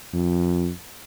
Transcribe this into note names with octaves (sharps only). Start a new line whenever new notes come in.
F2